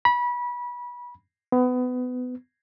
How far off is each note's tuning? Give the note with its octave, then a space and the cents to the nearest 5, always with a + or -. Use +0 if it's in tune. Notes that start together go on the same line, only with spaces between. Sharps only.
B5 -25
B3 +25